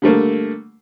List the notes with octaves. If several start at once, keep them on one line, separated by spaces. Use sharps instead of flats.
D3 G3 A3 A#3